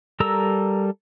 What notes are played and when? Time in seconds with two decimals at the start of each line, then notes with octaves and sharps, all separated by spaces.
0.20 G3 A4 A#4 A#5 E6